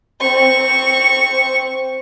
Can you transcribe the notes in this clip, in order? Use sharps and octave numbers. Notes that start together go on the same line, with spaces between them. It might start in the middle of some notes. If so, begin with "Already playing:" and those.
C4 C#6